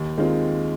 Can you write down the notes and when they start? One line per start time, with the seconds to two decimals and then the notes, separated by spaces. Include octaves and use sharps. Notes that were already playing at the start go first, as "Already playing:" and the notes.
Already playing: D#2
0.18 D#3 G#3 C4 F4